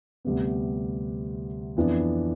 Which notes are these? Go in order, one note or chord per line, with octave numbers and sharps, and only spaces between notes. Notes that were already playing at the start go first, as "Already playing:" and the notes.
D2 C3 G3 B3
F2 E3 B3 D4